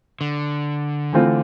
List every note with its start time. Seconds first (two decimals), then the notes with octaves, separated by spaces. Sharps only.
0.21 D3
1.13 E3 A3 C4 F4